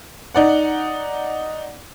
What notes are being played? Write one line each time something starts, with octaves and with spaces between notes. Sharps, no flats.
D#4 D5 F#5